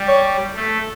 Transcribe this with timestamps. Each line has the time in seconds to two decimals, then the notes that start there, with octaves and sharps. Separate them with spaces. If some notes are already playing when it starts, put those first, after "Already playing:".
Already playing: G3
0.08 C#5
0.55 A3